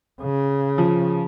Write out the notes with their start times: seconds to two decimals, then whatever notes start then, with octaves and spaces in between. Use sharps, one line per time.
0.22 C#3
0.78 F3